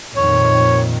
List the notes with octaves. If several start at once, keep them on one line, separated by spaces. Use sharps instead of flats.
F2 A#2 D#3 C#5